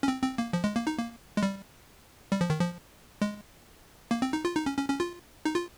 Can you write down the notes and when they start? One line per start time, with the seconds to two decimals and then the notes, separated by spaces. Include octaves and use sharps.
0.03 C#4
0.08 C4
0.23 C4
0.38 A#3
0.53 F3
0.64 G#3
0.76 A#3
0.87 D#4
0.98 A#3
1.37 G#3
1.43 G3
2.32 G3
2.41 F3
2.50 D#3
2.60 F3
3.22 G#3
4.11 A#3
4.22 C4
4.33 D#4
4.45 F4
4.55 D#4
4.66 C#4
4.78 C#4
4.89 C#4
5.00 F4
5.45 D#4
5.55 F4